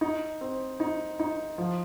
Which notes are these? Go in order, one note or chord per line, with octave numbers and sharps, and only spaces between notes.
D#4
C4
D#4
D#4
F3